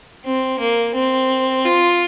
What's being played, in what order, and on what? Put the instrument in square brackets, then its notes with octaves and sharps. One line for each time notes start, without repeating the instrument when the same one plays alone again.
[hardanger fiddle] C4
A#3
C4
F4